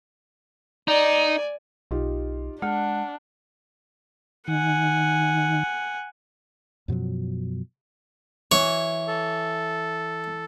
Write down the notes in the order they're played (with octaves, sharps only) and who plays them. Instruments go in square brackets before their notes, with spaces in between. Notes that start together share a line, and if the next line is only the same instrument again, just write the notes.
[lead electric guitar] D#4 [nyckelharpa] D5 G#5
[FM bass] B1 [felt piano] D#4 F4 G4
[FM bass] G#3 [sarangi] D4 [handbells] F#5 [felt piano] F6
[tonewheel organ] D#3 [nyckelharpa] F#5 G#5
[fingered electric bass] F#2 B2 F3 F#3
[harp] E3 [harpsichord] C#5
[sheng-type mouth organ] A4